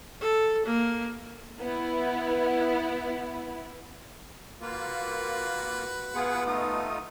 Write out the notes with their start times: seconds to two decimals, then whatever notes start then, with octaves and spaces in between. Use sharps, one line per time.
0.20 A4
0.66 A#3
1.61 B3 E4
4.61 A#3 F4 F#4 B4
6.14 B3 F4 G#4 F#5
6.46 A3 D#4 F4 D#6